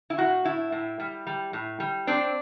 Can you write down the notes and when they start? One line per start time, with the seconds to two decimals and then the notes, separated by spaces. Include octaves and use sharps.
0.10 E4
0.18 A2 F#4
0.45 A2 E4
0.72 A2
1.00 G3
1.27 G3
1.53 A2
1.80 G3
2.07 C4 D4